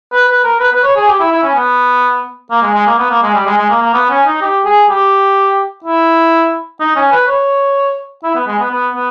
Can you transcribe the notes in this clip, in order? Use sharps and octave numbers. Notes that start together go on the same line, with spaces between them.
B4
B4
A#4
B4
B4
C#5
G#4
G4
E4
E4
C#4
B3
A#3
G#3
G#3
A#3
B3
A#3
G#3
G3
G#3
G#3
A#3
A#3
B3
C#4
D#4
G4
G#4
G4
E4
D#4
C#4
B4
C#5
E4
B3
G#3
B3
B3
B3